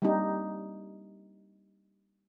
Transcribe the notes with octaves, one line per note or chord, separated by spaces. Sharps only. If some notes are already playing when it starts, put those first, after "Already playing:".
G3 A#3 C4 D4 D#4 G4